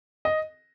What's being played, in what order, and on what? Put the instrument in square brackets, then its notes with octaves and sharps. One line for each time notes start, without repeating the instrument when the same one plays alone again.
[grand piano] D#5